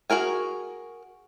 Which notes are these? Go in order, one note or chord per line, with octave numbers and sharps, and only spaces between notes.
F#4 G#4 A#4 G#5